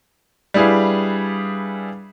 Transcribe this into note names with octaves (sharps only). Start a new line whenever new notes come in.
G3 D4 E4 G#4 B4 F5